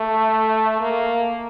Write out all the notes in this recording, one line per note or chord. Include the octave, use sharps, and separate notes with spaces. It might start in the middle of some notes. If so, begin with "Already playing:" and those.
Already playing: A3
A#3